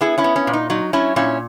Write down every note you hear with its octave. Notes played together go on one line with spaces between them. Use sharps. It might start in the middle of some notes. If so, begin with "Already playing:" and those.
B3 E4 G#4
C#4 E4
B3
C#4
A#2
D#4
F#3 D#4
F#3 C#4 E4
A#2 C#4 E4